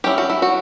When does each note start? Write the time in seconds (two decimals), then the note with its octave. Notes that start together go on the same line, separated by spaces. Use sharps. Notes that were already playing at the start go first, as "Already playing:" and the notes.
0.04 F#3 C#4 E4 G4
0.18 F#4
0.30 E4
0.42 F#4